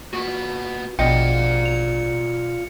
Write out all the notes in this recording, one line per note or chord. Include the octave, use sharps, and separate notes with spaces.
A#2 B3 F#4
A#1 B2 F4 D5 D#5 G5 C#7
F7